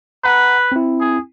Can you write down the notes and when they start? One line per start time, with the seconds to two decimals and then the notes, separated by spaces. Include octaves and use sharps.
0.24 B4 F#5 A#5
0.72 C4 E4
1.01 G#4